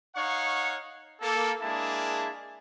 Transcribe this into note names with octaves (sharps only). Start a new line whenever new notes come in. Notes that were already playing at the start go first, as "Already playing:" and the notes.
D#4 C#5 F5 F#5 C#6
A#3 A4
G#3 A#3 D4 E4 G#4 A5